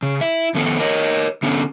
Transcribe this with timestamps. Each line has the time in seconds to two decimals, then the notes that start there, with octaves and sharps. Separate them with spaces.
0.03 C#3
0.21 E4 E5
0.55 F2 D#3 B3 A4
0.80 A#4 C#5 D#5
1.42 D3 B3 C#4 D4 A4